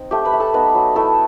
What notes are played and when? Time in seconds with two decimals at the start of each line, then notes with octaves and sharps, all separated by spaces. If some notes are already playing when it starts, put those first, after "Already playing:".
Already playing: C4 D#4
0.11 A3 G4 G5
0.25 B4 B5
0.33 A3
0.40 A4 A5
0.54 B3 D#4 B4
0.75 F#3
0.95 A3 E4 A4